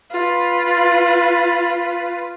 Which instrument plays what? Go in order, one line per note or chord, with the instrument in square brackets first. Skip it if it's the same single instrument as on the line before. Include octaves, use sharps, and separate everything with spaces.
[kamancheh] F4 B4